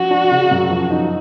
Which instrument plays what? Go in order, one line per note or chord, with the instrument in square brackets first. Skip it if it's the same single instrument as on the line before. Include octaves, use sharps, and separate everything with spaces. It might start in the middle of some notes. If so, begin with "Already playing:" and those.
Already playing: [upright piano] F3 C#4 [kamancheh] F#4
[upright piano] D4
C#3
F#2
F3
D#4